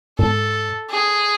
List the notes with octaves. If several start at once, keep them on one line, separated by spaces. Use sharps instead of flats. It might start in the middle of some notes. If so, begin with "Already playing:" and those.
G#2 A4
G#4